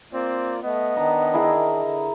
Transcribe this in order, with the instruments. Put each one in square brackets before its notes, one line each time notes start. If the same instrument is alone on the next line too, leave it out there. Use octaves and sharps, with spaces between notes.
[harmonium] A#3 F4 D5 [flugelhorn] C4
[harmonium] A3 [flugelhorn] B3 [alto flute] D#5
[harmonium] D#3 D4 [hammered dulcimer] A#5
[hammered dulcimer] E4 G#4 A#4
[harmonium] D3